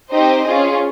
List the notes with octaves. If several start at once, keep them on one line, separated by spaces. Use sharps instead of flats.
C4 D#4 G4 C5 D#5
C#4 F4 G#4